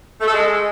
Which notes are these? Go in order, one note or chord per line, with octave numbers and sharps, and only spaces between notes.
A3
A4
G#3